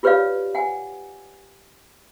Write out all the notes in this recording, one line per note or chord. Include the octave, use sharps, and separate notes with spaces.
F4 G4 B4 C#5 D5 F5
F#5 G#5